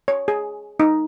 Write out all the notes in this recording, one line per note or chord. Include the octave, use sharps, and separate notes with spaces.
C#5
G#4
D#4